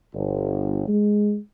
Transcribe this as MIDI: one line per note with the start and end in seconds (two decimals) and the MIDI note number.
0.14 0.87 31
0.87 1.37 56